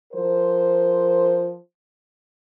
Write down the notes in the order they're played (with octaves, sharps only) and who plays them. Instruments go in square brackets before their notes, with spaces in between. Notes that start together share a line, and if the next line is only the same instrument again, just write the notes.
[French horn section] F3 A#4 C5